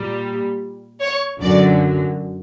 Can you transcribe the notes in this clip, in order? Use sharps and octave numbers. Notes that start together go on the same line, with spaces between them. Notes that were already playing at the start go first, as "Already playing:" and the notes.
Already playing: A#2 G3
C#5
F#2 D3 F#3 D5